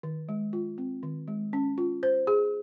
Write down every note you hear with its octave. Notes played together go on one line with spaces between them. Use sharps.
D#3
G#3
F4
C4
D#3
G#3
C#4
F4
C5
G#4